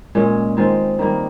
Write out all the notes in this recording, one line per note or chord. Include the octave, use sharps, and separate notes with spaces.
A#2 G#3 C#4
D#3 G#3 C4 F4
D#3 G3 A#3